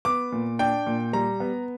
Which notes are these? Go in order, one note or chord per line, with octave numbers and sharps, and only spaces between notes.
B3 D6
A#2
D4 G5
A#2
G3 A#5
B3